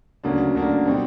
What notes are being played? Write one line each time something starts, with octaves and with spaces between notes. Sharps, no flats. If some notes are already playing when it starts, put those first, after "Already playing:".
D2 C#3 F#3 A#3 D4
D2 C#3 F#3 A#3 D4
B2 G3 C4 D#4